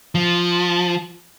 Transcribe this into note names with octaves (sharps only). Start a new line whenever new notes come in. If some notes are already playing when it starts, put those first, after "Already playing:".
F3